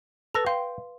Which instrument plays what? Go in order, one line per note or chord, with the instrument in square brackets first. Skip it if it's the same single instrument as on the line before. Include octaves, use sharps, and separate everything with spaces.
[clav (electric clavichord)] A4 [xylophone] B4 A#6 F7
[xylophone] F5 C6 [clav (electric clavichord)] G5